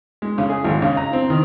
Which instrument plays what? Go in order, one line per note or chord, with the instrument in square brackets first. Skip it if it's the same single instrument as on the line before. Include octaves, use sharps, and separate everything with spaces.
[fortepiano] G#3
C#3
G#4
G#1
C#3
A#5
C4
D#3